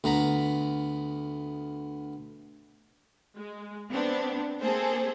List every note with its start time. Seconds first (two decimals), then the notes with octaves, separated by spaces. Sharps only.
0.04 D2 B3 A#5 B5
3.36 G#3
3.91 B3 C4 D4
4.61 A#3 C4 G#4 A4 C5